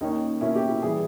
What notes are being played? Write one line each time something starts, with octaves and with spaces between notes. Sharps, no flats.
D#2 D#3 A#3 C#4 D#4
B2 A#3 C#4 E4
G4
E4
E3 G3 G#4